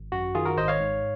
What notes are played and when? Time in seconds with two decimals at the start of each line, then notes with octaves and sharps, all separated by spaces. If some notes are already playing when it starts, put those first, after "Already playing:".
Already playing: G#1
0.12 F#2 F#4
0.35 D#3 F4 G#4
0.45 F#4 A#4
0.57 G#1 C5 D#5
0.68 C#5 F5
0.80 G#2